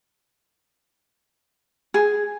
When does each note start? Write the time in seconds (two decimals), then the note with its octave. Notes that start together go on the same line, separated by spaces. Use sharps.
1.94 G#4